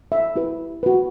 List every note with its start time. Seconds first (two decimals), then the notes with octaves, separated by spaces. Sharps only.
0.12 E5
0.36 E4 G4 B4
0.83 F#4 B4